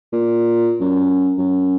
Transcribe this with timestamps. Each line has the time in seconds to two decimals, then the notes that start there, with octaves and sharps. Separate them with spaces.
0.13 A#2
0.80 F#2
1.38 F#2